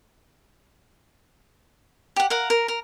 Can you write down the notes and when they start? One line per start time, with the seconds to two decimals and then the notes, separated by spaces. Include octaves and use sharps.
2.16 G4 F#5
2.30 A#4 F5 F#5
2.50 A#4
2.68 A#4